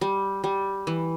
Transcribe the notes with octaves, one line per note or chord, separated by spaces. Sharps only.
G3
G3
E3